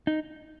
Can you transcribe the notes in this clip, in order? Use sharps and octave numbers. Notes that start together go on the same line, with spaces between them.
D#4